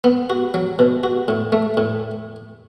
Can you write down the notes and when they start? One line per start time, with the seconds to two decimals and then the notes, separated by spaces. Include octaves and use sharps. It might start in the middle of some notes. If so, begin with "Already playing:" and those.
0.04 B3
0.30 F#4
0.54 F#3
0.79 B2
1.04 F#4
1.28 A2
1.52 A3
1.77 A2